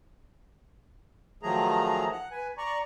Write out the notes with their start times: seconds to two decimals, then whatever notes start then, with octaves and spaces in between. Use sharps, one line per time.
1.43 D#3 F3 F#3 A3 G#4 A#5
2.12 F#5
2.32 B4 G#5
2.58 D5 A#5 C#6